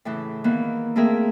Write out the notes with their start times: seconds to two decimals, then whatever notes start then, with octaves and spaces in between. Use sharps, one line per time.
0.05 A2 C#3 E3
0.44 D#3 E3 A#3 B3
0.96 A3 A#3 C4 G#4 A#4 E5